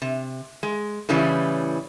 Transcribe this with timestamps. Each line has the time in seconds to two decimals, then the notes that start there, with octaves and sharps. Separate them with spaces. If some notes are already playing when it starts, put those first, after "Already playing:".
0.02 C3
0.63 G#3
1.09 A2 C#3 E3 G3 C#4